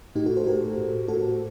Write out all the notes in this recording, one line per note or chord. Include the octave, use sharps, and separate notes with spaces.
A2 D#4 G4
F#4 A4
A4 C5
A2 G4 A#4
A2
A2 F#4 A4